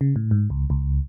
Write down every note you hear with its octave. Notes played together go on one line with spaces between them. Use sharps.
C#3
A2
G#2
C#2
C#2